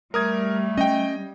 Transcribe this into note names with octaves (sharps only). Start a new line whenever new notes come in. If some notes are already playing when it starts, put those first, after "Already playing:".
G3 A3 A#4 D#6 G#6
C#4 D#5 G5